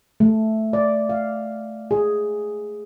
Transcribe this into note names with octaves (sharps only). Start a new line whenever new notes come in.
A3
D5
F5
G#4